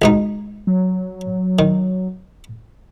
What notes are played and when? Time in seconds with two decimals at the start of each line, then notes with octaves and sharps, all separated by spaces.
0.02 C#2 B2 D#4
0.67 F#3
1.59 D#3